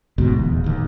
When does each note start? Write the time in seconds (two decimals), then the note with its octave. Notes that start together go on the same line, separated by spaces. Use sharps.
0.18 D2 G#2 B2
0.36 D#1 E2
0.64 D1 D#2